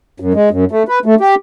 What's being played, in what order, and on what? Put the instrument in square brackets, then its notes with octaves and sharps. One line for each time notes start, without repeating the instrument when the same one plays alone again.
[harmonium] F#2
G#3
F#2
A3
B4
A3
G4